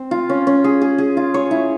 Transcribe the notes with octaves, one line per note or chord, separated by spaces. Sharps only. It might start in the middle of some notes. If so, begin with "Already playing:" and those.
Already playing: C4
F4
C#4
C#4
G#4
G#4
G#4
F4
C#5
E4